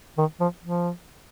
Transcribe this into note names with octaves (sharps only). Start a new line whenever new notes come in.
D#3
F3
F3